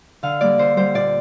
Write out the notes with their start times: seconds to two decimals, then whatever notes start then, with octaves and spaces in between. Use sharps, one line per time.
0.23 D3 F5
0.41 G3 A#3 D5
0.58 D3 C5
0.77 G3 A#3 C5
0.94 A#2 D5